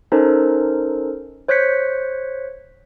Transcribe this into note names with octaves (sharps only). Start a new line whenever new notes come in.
C#4 D#4 A4 A#4 C5
C5 C#5 F#6 G6 B6 C#7